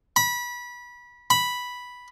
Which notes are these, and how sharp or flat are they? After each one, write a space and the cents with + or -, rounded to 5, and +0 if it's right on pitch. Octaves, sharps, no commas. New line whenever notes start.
B5 -25
B5 -5